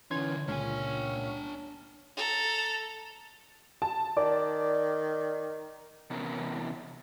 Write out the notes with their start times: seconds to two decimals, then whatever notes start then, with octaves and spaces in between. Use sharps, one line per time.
0.11 D3 E3 C#4 D#4 C6 G#6
0.48 C#2 A#2 C#4 D4 G#5
2.17 A4 A#5
3.82 A5
4.17 D#3 D5
6.10 C3 E3 B3 C#4 E4 A#4